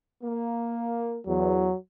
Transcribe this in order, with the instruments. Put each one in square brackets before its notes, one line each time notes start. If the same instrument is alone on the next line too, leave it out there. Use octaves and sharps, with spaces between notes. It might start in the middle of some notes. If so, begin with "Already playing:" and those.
[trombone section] A#3
[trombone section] E2 [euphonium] F#3